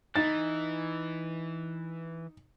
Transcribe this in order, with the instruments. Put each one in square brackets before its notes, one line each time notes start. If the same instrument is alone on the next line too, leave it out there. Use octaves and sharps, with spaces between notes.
[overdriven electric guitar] E3 [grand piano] D#4 A6